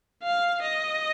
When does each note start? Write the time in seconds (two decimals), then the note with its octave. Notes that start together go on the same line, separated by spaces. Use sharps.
0.23 F5
0.62 D#5